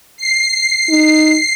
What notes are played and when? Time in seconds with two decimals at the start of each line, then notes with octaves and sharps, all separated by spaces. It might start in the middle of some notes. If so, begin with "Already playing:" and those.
0.17 C7
0.89 D#4